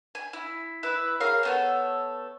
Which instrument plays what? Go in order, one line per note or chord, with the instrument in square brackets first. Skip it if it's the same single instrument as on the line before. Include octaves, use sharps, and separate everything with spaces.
[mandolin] G#5
E4
E4 B4 E5
[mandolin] G#4 A#4 F5 [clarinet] C#5
[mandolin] A3 B3 A4